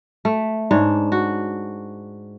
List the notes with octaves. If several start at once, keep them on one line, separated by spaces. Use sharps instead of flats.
A3
G#2 D4 C#5
F#4